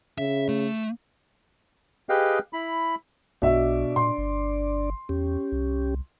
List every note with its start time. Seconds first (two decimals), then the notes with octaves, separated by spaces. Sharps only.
0.18 C#3 E5
0.49 A3
2.09 G4 G#4 B4 D#5 F5 G5
2.53 E4 B5
3.42 B1 B2 D4 D5 E5
3.96 A#2 C6
4.18 G1
5.09 E2 C#4 G4
5.52 C2